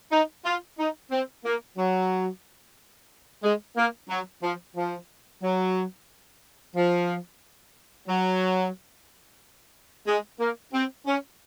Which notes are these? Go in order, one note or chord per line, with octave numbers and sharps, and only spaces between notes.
D#4
F4
D#4
C4
A#3
F#3
G#3
A#3
F#3
F3
F3
F#3
F3
F#3
G#3
A#3
C4
C#4